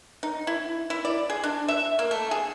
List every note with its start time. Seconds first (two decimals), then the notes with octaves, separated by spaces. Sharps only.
0.23 D#4
0.47 E4
0.90 E4
1.05 D5
1.30 G#4
1.44 D4
1.68 E5
1.99 A#3
2.11 A3
2.31 G#4